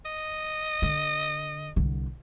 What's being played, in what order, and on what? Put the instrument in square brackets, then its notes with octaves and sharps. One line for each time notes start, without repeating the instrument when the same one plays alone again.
[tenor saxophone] D#5
[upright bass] D3
C2 D3